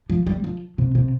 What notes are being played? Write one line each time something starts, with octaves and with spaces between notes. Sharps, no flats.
F3
G3
F3
C3
C3